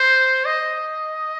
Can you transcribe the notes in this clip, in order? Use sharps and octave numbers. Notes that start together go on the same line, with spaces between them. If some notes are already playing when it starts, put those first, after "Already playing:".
Already playing: C5
D#5